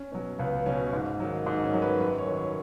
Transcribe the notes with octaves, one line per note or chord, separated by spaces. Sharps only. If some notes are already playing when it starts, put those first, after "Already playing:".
Already playing: C#4
B2 F#3
C#2 B3
B2 F#3 C#4
G#2
D#3 F#3
G#2 D#4
C#4
D#3 F#3
B4
F#2 B4
C#5
D#3 F#3
C#5